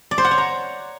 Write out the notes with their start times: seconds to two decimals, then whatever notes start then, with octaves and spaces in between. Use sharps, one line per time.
0.11 D5
0.18 C5
0.25 F#5
0.31 C#5
0.38 A#5